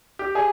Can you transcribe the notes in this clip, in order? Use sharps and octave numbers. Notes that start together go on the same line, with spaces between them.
G4
G#4